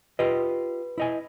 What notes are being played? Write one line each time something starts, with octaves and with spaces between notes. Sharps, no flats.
F4 G4 B4 D#5
E4 D#5 G#5